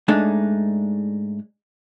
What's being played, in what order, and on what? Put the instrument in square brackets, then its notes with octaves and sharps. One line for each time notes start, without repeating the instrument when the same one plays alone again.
[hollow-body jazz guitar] G#2 G#3 A3 D4 D#4